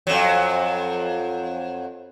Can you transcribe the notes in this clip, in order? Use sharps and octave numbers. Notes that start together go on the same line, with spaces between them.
F2 F#3